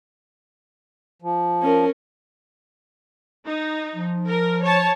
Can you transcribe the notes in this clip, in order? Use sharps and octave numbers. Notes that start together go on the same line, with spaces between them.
F3
C#4 A#4
D#4
F3
A#4
C#5 A5